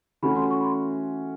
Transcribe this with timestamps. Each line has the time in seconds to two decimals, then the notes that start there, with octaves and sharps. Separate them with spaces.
0.22 E3 A3 C#4 F#4 B5
0.36 C6
0.51 C#6
0.60 B5
0.65 C6